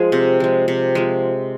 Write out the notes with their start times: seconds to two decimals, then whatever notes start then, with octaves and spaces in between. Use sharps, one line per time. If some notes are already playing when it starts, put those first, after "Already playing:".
Already playing: F3 G#3 G#4
0.12 C3
0.40 F3 G#3
0.68 C3
0.95 F3 G#3